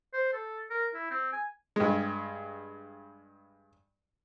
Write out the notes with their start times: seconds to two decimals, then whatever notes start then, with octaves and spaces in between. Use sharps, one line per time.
0.13 C5
0.33 A4
0.70 A#4
0.94 E4
1.10 C4
1.32 G#5
1.76 G2 G#3